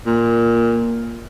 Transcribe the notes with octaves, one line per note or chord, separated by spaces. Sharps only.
A#2